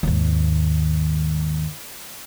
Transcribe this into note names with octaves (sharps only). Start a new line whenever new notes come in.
D#2 G#2